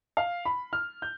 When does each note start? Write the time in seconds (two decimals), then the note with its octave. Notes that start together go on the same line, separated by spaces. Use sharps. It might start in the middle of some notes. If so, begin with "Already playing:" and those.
0.17 F5
0.45 B5
0.73 F6
1.02 G6